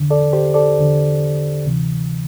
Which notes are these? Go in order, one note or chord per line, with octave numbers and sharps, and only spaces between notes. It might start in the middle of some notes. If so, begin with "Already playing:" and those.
Already playing: E2 D3
A4 D5
G4 C5
A4 D5
E2 D3
D2 C3 E3